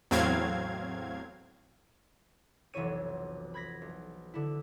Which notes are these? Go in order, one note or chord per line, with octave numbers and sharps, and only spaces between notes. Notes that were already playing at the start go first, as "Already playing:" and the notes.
E2 A2 F#3 C4 F5 G#6
F1 B1 E3 E4 C#5 D#7
B5 G#6 A#6 B6
B1
D3 E4